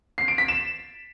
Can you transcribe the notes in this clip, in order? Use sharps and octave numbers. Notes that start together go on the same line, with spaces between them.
C7
D7
B6
E7